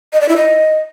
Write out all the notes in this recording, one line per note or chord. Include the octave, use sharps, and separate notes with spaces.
D#5
D5
E4
D#5